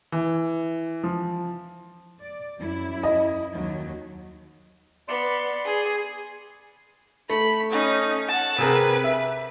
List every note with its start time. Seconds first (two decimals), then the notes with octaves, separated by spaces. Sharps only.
0.12 E3
1.04 F3
2.22 D5
2.58 F#2 E4
3.03 D#5
3.55 D#2 F#3
5.08 B3 D5 C6
5.65 G#4
7.30 A3 B5
7.71 C#4 D#4
8.28 F#5 A5
8.58 C3 G#4 A#4 B4
9.04 E5